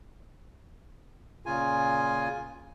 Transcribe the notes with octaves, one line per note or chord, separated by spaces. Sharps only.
A#2 C#3 F4 G#5